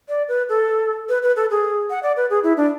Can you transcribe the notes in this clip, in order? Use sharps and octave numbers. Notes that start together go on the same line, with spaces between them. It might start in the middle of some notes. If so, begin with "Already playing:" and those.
D5
B4
A4
B4
B4
A4
G#4
F#5
D5
B4
G#4
E4
D4